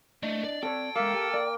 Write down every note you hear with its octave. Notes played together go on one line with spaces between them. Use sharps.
A3 D4 D#5
D5
C4 A4 C#5 D5 G5
G#3 A#3 A4 E5 F5
G4
A#3 D5